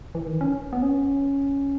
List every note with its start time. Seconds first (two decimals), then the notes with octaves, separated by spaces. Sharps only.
0.15 E3
0.26 D#3
0.41 C#4
0.73 B3
0.83 C#4